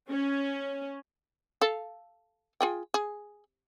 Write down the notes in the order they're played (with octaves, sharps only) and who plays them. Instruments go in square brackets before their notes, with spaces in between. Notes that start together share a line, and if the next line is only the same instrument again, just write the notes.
[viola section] C#4
[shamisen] A4 F5
F4 G#4 G5
G#4